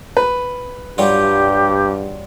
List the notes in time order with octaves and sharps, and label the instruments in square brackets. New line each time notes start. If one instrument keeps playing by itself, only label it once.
[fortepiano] B4
[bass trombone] G2 [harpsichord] F#3 G3 F4 [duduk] G4